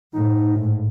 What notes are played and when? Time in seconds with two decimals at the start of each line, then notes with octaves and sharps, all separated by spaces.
0.13 A2 D#4
0.56 G#2